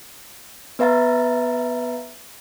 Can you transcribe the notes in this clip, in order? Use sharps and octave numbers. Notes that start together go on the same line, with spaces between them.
B3 B4 E5 F5 A#5 A6